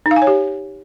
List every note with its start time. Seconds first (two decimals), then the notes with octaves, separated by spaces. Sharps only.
0.06 D#4
0.11 F5
0.16 G#5
0.22 C#5
0.27 G4